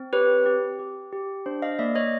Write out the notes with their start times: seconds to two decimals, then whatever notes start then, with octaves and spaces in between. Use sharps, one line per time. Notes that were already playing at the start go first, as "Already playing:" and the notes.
Already playing: C4
0.13 G4 B4 C#5
0.46 G4
0.79 G4
1.13 G4
1.46 D4 C5
1.62 D#5 F5
1.79 A#3 D5 E5
1.95 C#5 D#5